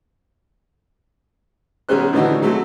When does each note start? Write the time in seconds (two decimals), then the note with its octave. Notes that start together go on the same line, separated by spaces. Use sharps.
1.89 B1 D#3 G3 C#4 C5 F#6
2.13 A2 D3 E3 D4 D#4 F#4
2.42 F#3 A3 C4